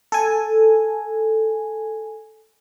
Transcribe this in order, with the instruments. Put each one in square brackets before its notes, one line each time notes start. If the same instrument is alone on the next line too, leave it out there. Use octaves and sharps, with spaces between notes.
[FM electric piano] A4 G#5